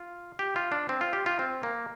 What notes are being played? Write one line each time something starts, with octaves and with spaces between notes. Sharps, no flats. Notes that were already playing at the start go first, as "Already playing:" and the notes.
Already playing: F4
G4
F4
D4
C4
F4
G4
F4
C4
A#3